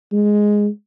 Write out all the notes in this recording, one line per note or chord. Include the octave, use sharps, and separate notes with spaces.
G#3